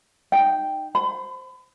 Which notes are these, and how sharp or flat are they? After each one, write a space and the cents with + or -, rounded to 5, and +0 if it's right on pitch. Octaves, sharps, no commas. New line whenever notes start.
D#4 -15 G5 +0
C5 +0 B5 +35